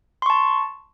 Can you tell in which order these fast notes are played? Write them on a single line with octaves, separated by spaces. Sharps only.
C6 C#6 A5